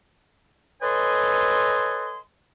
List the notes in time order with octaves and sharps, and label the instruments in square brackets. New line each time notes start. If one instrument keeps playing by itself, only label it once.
[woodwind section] A4 B4 C#5 D#5 G#5 C6